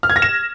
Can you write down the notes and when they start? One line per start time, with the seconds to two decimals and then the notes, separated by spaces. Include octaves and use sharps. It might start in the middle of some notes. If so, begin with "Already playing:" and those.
0.03 F6
0.10 G#6
0.16 A#6
0.22 E7